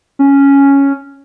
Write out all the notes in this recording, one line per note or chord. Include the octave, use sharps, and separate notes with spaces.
C#4